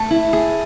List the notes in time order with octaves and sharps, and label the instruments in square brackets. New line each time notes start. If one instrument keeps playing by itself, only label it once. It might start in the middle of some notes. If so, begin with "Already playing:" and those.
Already playing: [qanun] A3 [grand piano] A5
[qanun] E4
G#4